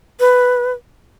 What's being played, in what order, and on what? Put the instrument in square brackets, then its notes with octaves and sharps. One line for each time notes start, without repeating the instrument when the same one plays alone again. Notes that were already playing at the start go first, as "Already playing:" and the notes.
[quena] B4